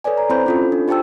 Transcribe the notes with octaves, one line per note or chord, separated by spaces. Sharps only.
A4 B4 C#5 D5 G#5
A#5
C4 E4 C5 B5 C#6 G6
C#4 F4 A4
D4
F4 G4 C5 G5 A5 E6